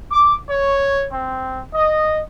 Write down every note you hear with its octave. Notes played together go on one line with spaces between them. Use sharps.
D6
C#5
C4
D#5